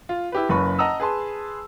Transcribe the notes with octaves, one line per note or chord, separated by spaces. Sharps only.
F4
E4 G4 B4
F#1 F#2 B4 B5 C#6
D#5 F#5 A5 A#5 D#6 E6
G#4 B4 A5 C6